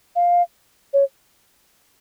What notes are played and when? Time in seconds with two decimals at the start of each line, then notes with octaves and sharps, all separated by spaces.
0.16 F5
0.93 C#5